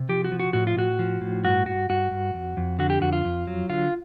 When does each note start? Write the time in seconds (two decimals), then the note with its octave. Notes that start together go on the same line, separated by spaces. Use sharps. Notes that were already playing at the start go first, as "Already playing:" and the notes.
Already playing: C3
0.09 F3 G4
0.24 F#4
0.32 F3
0.39 F#4
0.53 A2 F#4
0.67 F4
0.77 A2 F#4
0.99 F3
1.21 A2
1.44 G2 F#4
1.66 G2 F#4
1.90 G2 F#4
2.11 G2
2.34 F2
2.57 F2
2.79 D3 F#4
2.90 G4
3.01 F2 F#4
3.13 F4
3.25 F2
3.47 F#3
3.69 D3 F4